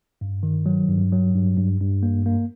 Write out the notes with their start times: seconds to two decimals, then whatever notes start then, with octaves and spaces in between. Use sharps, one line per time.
0.21 G2
0.43 D#3
0.66 F#3
0.88 G2
1.12 F#3
1.34 G2
1.57 G2
1.80 G2
2.03 A#3
2.26 A#3